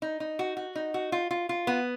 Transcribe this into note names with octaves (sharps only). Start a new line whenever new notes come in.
D#4
D#4
F#4
F#4
D#4
F#4
F4
F4
F4
B3